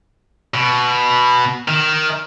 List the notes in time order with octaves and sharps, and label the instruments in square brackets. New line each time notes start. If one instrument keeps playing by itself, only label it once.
[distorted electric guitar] B2
D#3